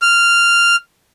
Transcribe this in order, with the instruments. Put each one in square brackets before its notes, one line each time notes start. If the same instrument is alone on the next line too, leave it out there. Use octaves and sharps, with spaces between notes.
[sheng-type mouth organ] F6